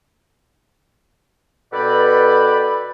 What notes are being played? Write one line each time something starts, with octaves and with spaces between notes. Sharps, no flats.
B2 A4 B4 D5 G5 B5